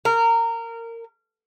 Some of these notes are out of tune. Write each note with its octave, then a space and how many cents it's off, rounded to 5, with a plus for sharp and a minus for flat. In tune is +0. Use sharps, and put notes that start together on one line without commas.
A#4 -20